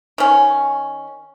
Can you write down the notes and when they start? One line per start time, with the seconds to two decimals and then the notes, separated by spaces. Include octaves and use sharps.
0.18 D#3 C#4